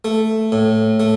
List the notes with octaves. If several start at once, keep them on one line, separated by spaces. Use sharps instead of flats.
A3
A2
A3